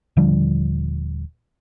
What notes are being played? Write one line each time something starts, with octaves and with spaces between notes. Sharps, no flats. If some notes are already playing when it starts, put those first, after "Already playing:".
D#1 D3 F3 G3